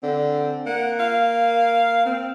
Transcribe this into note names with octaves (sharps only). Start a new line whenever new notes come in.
D3 C4
A#3 F#5
F5
C4